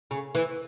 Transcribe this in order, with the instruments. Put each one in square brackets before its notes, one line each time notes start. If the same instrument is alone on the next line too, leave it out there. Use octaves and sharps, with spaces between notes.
[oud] C#3
E3